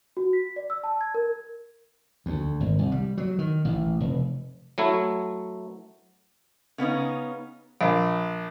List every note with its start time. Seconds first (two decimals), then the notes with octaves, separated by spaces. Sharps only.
0.17 F#4
0.33 B6
0.56 D5
0.70 E6
0.84 A5
1.01 G#6
1.15 A#4
2.26 D2
2.60 G#1
2.79 C2
2.92 G3
3.18 F#3
3.39 D#3
3.65 A1
4.01 F1
4.78 F#3 A3 E4
6.78 C#3 B3 C#4 D#4
7.81 A#1